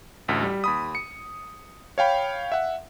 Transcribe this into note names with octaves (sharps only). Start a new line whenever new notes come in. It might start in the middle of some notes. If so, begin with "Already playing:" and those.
A1 D2 B6
G3
D#2 B5 D#6
C#7
C#5 F5 G5 B5
E5 F#5